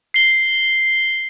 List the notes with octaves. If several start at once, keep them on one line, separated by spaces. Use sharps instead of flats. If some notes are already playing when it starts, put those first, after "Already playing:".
C7 G7